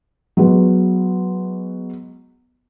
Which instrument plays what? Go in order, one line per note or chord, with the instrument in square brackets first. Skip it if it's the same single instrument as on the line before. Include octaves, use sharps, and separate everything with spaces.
[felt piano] F#3 G#3 B3